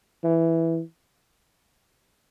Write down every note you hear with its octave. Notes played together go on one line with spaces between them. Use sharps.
E3